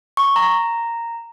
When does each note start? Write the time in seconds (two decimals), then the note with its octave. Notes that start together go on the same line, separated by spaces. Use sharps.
0.17 C#6
0.36 A#5